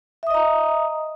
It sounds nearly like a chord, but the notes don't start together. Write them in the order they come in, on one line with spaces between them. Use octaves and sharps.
E5 D#6 D#5 A#5